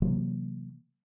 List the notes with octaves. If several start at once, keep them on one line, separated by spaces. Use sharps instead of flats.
C3 E3 F#3 A#3